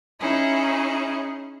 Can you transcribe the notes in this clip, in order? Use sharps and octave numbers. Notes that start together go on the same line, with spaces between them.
C#4 D#4 E4 G#4